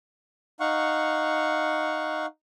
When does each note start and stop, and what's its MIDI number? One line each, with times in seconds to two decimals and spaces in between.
0.60 2.26 63
0.60 2.26 77
0.60 2.26 78
0.60 2.26 85